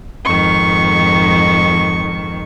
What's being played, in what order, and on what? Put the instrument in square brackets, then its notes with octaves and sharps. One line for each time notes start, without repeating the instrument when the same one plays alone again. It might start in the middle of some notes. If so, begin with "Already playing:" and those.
[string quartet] F2 G#2 D#3 [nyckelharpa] C#6